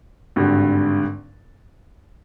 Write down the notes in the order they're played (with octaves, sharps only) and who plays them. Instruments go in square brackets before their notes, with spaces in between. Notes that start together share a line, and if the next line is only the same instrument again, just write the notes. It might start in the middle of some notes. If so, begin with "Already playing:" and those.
[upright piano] G#1 G2 D3